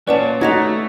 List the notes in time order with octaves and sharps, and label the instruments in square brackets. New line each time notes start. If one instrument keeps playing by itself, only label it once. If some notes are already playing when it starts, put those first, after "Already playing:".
[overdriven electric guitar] A#2 [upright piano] C#4 D5 [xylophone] B4 F#5 A5
[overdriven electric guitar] A3 [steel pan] D#4 F#4 [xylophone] G#6 A#6 F7